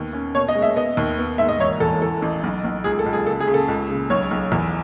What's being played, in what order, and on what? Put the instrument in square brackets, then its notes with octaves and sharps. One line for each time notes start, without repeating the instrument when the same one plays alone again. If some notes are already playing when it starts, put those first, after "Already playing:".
Already playing: [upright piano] D#2 B3
C#4
B2 C#5
D#5
G#3
E5
B3 D#5
D#2
B3
G#2 E5
D#5
E1 C#5
E2 A4
E3 A4
A1
B1
B1
C#2 G#4
A4
C#2
G#4
C#3 A4
G#4
C#3
A4
C#2
C#3
B1 C#5
B1
E2